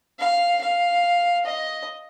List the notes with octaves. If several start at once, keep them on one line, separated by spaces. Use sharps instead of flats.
F5
F5
D#5